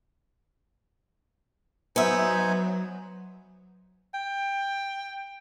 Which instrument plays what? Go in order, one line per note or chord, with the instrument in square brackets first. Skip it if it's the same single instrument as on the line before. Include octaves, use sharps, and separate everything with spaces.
[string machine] F#3 [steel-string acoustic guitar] B3 E5 [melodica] D#4 C5 G#5
[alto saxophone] G5